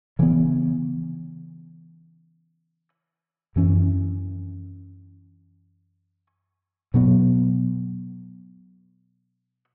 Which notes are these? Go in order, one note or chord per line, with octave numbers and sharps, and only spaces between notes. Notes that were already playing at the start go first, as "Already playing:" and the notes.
C#3 E3 B3
F#2 E3 C#4
B2 F#3 B3